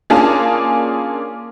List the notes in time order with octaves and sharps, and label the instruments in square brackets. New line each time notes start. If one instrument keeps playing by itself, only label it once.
[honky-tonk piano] A#3 C#4 D4 F4 G#4 A5